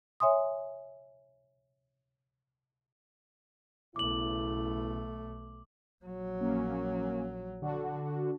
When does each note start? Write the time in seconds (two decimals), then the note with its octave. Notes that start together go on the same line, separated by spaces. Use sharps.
0.20 C#5 E5 G#5 C6 D#6
3.96 B1 C#3 A3 B3 E4 D6 F#7
6.04 A#1 F#3
6.41 A#3 C#4
7.62 D3 D4 F#4